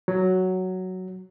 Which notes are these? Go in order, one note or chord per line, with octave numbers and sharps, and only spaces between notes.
F#3